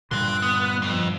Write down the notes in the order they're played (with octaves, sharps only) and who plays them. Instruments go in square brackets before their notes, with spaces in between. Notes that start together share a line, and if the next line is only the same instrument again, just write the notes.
[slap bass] G2 A#2 D3 [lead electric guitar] G5 C6 [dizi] F#6
[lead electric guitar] B3
F2